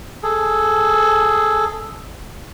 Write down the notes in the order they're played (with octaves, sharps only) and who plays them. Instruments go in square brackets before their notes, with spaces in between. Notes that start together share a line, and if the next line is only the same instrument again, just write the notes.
[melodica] G#4 A4